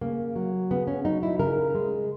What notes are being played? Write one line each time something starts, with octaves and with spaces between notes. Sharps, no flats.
C#3 A#3
F#3
C#3 B3
C#4
F#3 D#4
E4
C#3 A#4
G#3